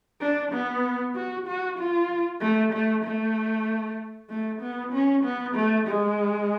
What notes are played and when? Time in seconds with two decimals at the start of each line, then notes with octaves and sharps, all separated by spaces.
0.21 D4
0.52 B3
1.15 F#4
1.47 F#4
1.78 F4
2.41 A3
2.73 A3
3.04 A3
4.30 A3
4.62 B3
4.93 C#4
5.24 B3
5.56 A3
5.87 G#3